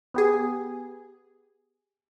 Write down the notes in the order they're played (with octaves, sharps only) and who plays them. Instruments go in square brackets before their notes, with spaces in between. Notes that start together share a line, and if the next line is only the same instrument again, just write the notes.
[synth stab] B3 G4 G#4